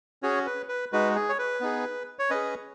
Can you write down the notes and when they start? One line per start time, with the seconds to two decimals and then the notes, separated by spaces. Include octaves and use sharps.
0.23 C#4 F#4 G#4 C#5
0.46 B4
0.69 B4
0.93 G#3 D#4 F#4 B4
1.16 G#4
1.29 C#5
1.39 B4
1.60 B3 D#4 G#4
2.19 C#5
2.30 C#4 G#4 B4 D#5